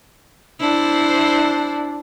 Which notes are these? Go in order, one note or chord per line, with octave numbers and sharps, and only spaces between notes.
D4 E4 C5